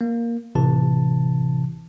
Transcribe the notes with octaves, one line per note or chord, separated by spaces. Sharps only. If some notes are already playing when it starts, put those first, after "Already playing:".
A#3
A1 C3 E3 A5